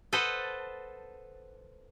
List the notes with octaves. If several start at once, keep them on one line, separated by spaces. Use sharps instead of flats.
A4 B4 C5 D#5 F#5 A5